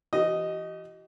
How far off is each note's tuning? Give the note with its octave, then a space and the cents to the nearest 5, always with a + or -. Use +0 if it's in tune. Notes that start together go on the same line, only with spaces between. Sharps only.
E3 +35 G4 -40 D#5 +0